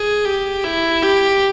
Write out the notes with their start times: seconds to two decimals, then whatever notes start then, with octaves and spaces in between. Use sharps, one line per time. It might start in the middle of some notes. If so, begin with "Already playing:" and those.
Already playing: G#4
0.25 G4
0.64 E4
1.02 G4